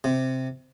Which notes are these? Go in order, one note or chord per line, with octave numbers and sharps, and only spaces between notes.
C3